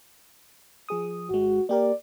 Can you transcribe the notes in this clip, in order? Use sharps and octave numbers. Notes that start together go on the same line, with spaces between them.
F3 G#4 D#6
G#1 G#3 F#4
A#3 G4 A#4 D5